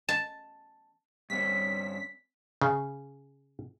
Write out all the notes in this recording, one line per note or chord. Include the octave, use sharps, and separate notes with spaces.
A5
G2 C4 C#4 B6
C#3